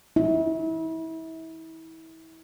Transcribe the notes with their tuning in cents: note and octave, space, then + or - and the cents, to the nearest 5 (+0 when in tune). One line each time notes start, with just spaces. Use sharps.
E4 -30